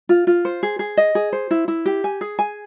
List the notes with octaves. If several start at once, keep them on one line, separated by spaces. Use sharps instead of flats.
F4
F4
C5
G#4
G#4
D#5
G#4
C5
E4
E4
G4
G#5
G#4
G#5